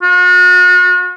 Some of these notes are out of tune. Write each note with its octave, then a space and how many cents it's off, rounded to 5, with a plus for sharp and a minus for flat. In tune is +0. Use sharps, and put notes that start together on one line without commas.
F#4 -40